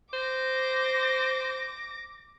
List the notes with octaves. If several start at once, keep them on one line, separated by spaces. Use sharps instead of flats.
C5 D6 A#6